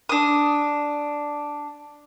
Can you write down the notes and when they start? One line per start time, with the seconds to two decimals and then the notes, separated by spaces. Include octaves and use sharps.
0.09 D4 D#6